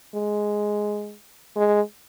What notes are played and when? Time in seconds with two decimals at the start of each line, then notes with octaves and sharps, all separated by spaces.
0.15 G#3
1.56 G#3